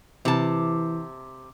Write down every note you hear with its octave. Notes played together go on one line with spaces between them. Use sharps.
C3 E3 A5